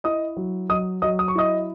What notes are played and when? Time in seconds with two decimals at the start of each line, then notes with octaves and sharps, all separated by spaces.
0.04 E4 D#5 D#6
0.37 F#3
0.69 F#3 D#5 D#6
1.02 F#3 D#5 D#6
1.19 D#6
1.28 C#6
1.35 E4 D#5 D#6